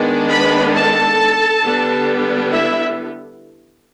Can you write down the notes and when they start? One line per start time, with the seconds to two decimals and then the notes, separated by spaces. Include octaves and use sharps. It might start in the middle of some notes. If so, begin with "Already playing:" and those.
Already playing: D#3 G#3 B3 D4
0.30 B4 B5
0.74 A4 A5
1.63 D3 G3 B3 D4
2.52 E4 E5